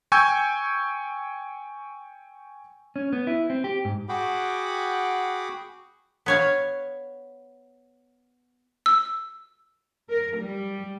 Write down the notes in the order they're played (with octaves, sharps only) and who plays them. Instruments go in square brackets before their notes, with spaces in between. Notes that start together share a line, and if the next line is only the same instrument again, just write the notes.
[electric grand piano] G5 G#5 C#6 E6 G6 G#6
[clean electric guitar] C#4
B3
E4
C4
G4
G#2
[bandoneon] F#4 G#4 F#5 G5 B5 D6
[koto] B3 C#5 F5
[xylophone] E6
[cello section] A#4
G3